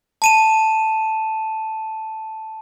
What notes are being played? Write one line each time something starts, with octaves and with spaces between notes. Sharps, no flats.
A5 D#7 E7